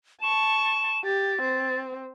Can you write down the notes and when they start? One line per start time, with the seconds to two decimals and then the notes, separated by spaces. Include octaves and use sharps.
0.22 A5 C#6 E7
1.05 G4 A6
1.42 C4